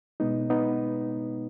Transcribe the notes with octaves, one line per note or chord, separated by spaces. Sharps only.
B2 G#3 B3 D#4
B3 D#4